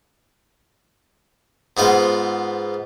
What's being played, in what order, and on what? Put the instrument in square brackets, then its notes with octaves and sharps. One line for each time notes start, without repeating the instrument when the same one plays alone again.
[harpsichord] G#2 B3 F4 C5